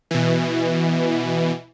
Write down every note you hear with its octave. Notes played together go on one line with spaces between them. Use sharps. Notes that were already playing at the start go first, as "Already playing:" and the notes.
B2 E3